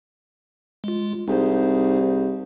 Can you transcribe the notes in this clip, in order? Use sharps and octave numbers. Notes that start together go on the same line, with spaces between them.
G#3 F4
C2 D#4 G#4 C5